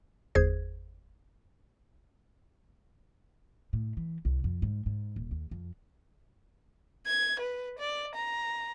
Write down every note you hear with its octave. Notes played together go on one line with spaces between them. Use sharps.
G1 E2 G#4 C5 G#6
A2
E3
C2
F2
G#2
G#2
D#1
D#2
F2
G#6
B4
D5
A#5